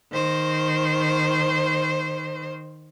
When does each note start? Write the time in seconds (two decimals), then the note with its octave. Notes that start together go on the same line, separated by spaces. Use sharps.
0.12 D#3 C5